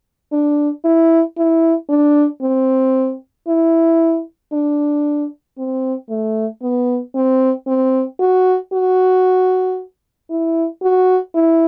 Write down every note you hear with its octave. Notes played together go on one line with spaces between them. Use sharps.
D4
E4
E4
D4
C4
E4
D4
C4
A3
B3
C4
C4
F#4
F#4
E4
F#4
E4